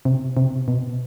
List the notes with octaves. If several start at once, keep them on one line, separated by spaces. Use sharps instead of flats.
C3
C3
B2